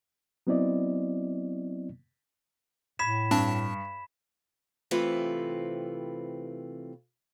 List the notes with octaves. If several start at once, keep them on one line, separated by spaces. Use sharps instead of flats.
F#3 B3 C4 E4 D5 D#5
A2 B5 G#6 B6 E7
G2 C4 D4 A5
C3 E3 A3 C4 F4 B4